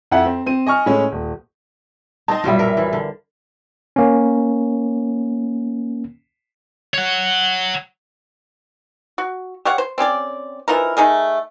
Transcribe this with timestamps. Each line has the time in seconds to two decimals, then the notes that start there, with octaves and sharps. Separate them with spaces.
0.11 F2 E4 E5 F#5
0.26 C4
0.46 C4 D#7
0.66 D#5 G#5 C#6 F6
0.86 A2 G#3 C#4
1.12 D#1
2.28 C4 D#4 D#5 A5
2.44 A#1 F#2 B2 F3 G3 E5
2.59 A#4
2.77 E3
2.93 D3
3.96 A#3 C#4
6.94 C#5 F#5
9.18 F#4
9.65 G4 C#5 F5 F#5
9.78 C5
9.98 C4 C#4 G4 D5
10.68 E3 F3 D#4 A#4
10.97 A3 D#4 G#4 A#4